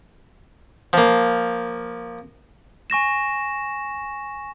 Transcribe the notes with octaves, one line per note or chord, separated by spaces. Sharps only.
F3 A#3
G#5 C#6 A#6 E7